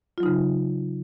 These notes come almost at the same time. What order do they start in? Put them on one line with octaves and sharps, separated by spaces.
F4 F#3 D#4 C#3